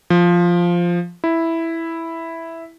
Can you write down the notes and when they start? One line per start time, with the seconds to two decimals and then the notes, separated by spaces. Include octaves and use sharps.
0.10 F3
1.24 E4